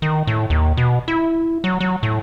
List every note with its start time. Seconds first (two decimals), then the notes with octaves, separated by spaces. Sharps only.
0.02 D#3
0.27 A2
0.50 D#2
0.77 B2
1.08 E4
1.64 F#3
1.81 F#3
2.03 A2